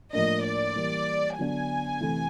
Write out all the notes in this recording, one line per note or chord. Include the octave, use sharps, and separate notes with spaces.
A2 F3 A#3 D4 D#5
D5
E3 G3 A#3
D3 F#3 B3 D4 G#5
C3 E3 A3